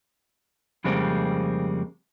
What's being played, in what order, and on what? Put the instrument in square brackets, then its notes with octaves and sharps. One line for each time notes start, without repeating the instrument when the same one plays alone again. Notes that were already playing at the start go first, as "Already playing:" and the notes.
[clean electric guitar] F2 C#3 G3 G#3 A#3 C4